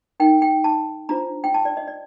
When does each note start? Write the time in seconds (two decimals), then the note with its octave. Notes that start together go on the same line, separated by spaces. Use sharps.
0.20 D#4 A#4 G5
0.42 G5
0.64 A5
1.09 D4 F4 C5 A#5
1.44 G5
1.54 A5
1.65 D5
1.77 D#5
1.87 D5